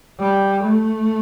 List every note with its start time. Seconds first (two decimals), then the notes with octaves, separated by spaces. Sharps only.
0.19 G3
0.64 A3